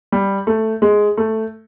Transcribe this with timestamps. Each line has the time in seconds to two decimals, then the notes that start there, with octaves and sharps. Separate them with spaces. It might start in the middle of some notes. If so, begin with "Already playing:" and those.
0.12 G3
0.47 A3
0.82 G#3
1.17 A3